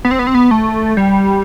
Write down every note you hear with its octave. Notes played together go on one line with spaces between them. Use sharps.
B3
C4
B3
C4
B3
A3
G3